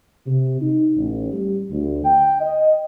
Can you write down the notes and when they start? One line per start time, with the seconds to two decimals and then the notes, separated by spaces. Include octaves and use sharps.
0.27 C3
0.62 D#4
0.96 A1
1.33 G3
1.71 D2
2.05 G5
2.40 D#5